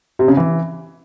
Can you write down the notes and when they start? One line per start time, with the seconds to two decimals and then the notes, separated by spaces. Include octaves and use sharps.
0.19 C3
0.28 C#3
0.37 E3